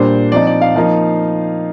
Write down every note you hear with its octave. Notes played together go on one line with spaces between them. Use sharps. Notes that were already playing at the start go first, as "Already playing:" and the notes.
Already playing: A#2 G3 D4 C5
F3 C4 D#4 D5
D5
F5
F3 A#3 D#4 F5